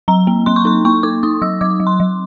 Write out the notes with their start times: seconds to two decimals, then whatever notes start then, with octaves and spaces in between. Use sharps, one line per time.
0.08 F#3 A#5
0.27 A#3
0.46 F#3 C6
0.56 C#6
0.65 D#4 C6
0.85 A#3 C#6
1.03 D#4 D6
1.23 D#4 D#6
1.42 F#3 E6
1.61 F#3 D6
1.80 F#3
1.87 C6
2.00 F#3